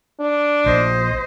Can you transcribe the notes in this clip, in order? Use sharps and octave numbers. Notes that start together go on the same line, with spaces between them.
D4
A#1 C5 D#5